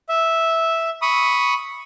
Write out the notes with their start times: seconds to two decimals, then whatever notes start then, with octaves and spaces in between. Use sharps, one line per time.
0.09 E5
1.02 B5 C#6 D#6